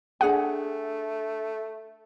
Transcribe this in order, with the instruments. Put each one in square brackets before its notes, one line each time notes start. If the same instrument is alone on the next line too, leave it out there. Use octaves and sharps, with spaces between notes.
[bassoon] A3 [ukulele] D4 G#4 G#5 [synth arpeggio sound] F#5